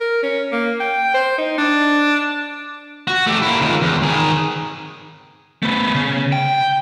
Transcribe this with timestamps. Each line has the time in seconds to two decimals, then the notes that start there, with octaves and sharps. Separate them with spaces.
0.01 A#4
0.23 C#4
0.52 A#3
0.80 G5
1.14 C5
1.38 D#4
1.58 D4
3.07 F#4
3.27 A3 G4
3.42 A#3 E4
3.61 C#2 D#3
3.82 E2
4.02 D#3 G#4
5.63 A3 B3
5.95 C#3
6.32 G5